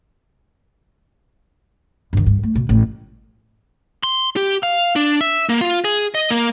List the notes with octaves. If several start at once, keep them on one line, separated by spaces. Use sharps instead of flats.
G2 D#3
G2
A3
B2
A1 A3
C6
G4
F5
D4
E5
A#3
F4
G#4
D#5
A#3